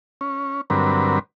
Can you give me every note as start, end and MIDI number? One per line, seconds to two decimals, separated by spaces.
0.21 0.61 61
0.70 1.19 43
0.70 1.19 50
0.70 1.19 54
0.70 1.19 60
0.70 1.19 70
0.70 1.19 71